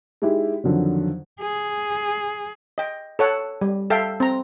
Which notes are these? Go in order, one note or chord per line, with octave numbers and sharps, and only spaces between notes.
G#3 D#4 E4 G4
F2 D3 D#3 F#3
G#4
D#5 G5
A4 C#5 F#5
G3
A4 E5 F5 G5
C4 A#5